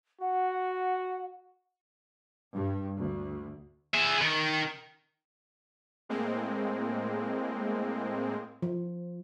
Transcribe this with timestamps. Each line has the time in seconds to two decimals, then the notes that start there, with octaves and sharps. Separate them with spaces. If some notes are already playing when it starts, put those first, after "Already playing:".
0.21 F#4 F#5
2.54 G2
2.99 D2
3.94 G#4 E5
4.21 D#3
6.09 A2 G#3 A#3 C4
8.62 F3